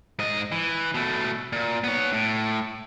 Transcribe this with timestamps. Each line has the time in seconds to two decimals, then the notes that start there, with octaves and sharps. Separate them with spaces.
0.19 G#2 D#5
0.52 E3
0.94 B2 A3
1.52 A#2
1.84 B3 C#5
2.13 A2